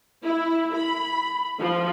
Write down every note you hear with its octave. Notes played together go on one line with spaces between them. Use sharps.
E4
B5
F3